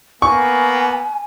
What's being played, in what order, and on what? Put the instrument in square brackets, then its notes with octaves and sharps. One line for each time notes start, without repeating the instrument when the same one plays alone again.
[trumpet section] A#3 B3 [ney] G#5 [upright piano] C#6